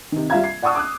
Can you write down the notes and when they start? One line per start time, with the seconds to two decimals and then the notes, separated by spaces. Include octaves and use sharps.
0.12 C3 D#3
0.30 G3 F4 E5 F5 A#5 G#6
0.44 C7
0.62 D5 F#5 A5 C#6 D#6 E6
0.75 D6 E6 F#6